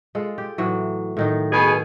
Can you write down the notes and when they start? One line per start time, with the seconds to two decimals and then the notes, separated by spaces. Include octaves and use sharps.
0.15 G#3 F4 A4
0.38 G4
0.58 A2 E3 F#3
1.17 A2 D#3 D#4
1.53 B2 G#4